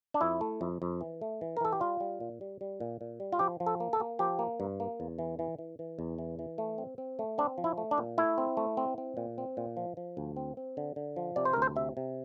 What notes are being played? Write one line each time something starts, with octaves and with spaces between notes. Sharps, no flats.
D4
F2 E4
A3
F2
F2
E3
A3
E3
A#4
E3 A4
G4
G3 F4
G3
A#2
G3
G3
A#2
A#2
G3
F4
F3 G4
F3
A4
A#3
A4
A#3
F3 G4
A#3
G2
A#3
E2
E3
E3
E3
E3
E2
E3
E3
A3
C4
C4
A3
C4 D4
F3
E4
A3
D4
A#2
A3 E4
C4
A3
C4
C4
A#2
C4
A#2
F3
F3
D2
C4
C4
D3
D3
F3
C3 D5
C5
D2 A#4
C5
C3 E5
C3